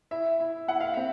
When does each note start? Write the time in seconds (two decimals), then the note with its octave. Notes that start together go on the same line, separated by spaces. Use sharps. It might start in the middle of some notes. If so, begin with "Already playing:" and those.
0.11 E4 E5
0.40 E4
0.68 E4 F#5
0.81 F5
0.94 C4 E5